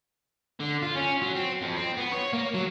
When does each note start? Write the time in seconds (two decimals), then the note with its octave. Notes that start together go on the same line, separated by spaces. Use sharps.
0.60 D3
0.82 F4
0.95 C#4
1.21 F#3
1.35 C4
1.62 F2
1.77 C4
1.97 B3
2.12 C#5
2.33 A#3
2.54 F#3